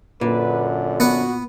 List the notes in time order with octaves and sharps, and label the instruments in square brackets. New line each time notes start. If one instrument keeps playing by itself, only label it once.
[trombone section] F#2 D3 [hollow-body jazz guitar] A#2 [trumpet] B4
[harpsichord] B3 F#5 [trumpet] F#4